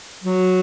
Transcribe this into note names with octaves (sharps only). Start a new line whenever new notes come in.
F#3